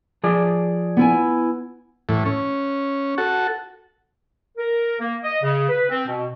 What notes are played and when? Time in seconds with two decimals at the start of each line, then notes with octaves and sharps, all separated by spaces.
0.24 F3 G#4 D5
0.97 B3 E4 G#5
2.09 A2 E3
2.25 C#4
3.18 F#4 A4
4.57 A#4
4.99 A#3
5.23 D#5
5.42 C#3
5.68 B4
5.89 C4
6.07 B2